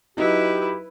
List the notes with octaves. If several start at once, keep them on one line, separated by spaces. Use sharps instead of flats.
F#3 D#4 E4 G4 B4